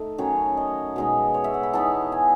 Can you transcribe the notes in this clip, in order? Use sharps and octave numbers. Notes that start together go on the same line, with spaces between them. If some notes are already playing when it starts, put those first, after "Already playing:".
Already playing: A3 D#4
D#3 F#3 C#4 C#5
D#5
B2 G#3 D#4
C#5
E5
F#5
B5
E3 B3 D#4 A5
G#5